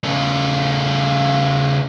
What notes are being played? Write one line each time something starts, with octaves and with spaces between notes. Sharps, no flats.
C#3 A3